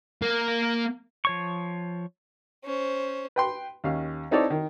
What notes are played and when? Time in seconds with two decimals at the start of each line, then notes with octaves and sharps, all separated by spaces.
0.22 A#3
1.25 F3 C#5 C#6
2.64 C#4 C5
3.36 B4 G5 C6
3.84 D#2 C#4 F5
4.31 C4 D#4 E4 A4 C#5 D5
4.50 D#3